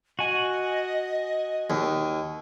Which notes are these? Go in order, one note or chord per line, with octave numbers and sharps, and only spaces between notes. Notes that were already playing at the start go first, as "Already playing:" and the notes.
F#4 D#5 G#5
D#2